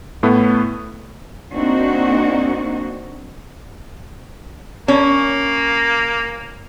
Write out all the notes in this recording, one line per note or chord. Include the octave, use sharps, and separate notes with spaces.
A2 A3 B3
A#3 C4 D4 D#4 F#4
A#3 C#4